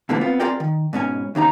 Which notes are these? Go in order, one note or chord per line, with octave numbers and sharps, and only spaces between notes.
B2 D3 E3 A3 A#3 C4
B3 C4 F4
C4 F4 G#4 A#4 D5 G5
D#3
G#2 B2 C#4 G#5
D#2 C#3 D#4 A#5